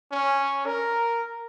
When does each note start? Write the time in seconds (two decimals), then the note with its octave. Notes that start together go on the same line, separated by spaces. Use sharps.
0.12 C#4
0.66 A#4